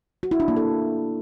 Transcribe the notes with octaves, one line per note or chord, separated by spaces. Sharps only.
F#4
E4
D4
A#3
A4